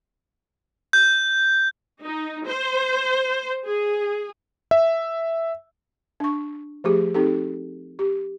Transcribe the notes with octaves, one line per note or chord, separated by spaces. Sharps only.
G6
D#4
C5
G#4
E5
D4 C#6
F3 A3 G4 G#4
C4 D#4 G4 A4
G4